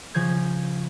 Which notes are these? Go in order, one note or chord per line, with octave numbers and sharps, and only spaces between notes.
C#3 F3 G6 G#6